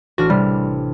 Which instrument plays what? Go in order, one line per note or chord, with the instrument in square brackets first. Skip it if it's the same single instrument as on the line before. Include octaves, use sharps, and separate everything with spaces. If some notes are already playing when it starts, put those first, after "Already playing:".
[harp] A1 D4 F6 [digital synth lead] F#4
[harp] C3 [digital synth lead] G3